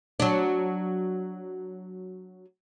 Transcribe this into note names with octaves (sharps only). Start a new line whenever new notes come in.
F#3 D4